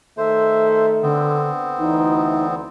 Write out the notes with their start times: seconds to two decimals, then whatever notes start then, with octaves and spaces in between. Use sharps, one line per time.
0.18 D#3 A3 A4 C5 E5
1.03 D3 B3 C4
1.79 D2 E3 D#4